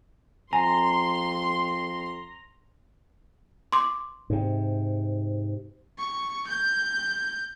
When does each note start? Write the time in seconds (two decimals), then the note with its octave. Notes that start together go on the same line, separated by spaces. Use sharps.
0.53 F2 G#5 A#5 C6
3.72 C6 D6
4.30 G#2 C3
5.99 C#6
6.48 G6